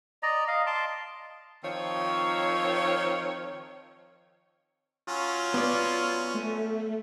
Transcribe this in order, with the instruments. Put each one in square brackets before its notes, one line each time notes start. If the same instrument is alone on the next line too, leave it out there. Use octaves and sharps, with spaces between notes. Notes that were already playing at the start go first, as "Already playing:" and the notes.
[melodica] D5 D#5 A#5
D#5 F5
A5 C6 D6
[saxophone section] D#3 F3 C4 C#5
[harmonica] F#3 C#4 [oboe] F4
[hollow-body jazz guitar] B3 D5
[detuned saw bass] A3